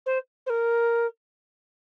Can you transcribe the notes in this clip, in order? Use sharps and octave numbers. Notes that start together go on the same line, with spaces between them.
C5
C5
A#4